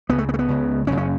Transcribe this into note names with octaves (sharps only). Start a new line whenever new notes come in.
C#2 C#3 B3
A3
B3
A3
B3
C#2 C#3
F#1 F#2 C#3 C#4
C#4